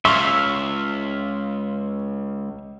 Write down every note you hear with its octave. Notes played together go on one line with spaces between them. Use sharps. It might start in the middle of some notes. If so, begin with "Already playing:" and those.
C#2 E5 F5 C6 C#6